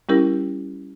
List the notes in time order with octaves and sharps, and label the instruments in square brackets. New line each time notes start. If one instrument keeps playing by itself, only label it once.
[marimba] G3 C#4 E4 G4 A#4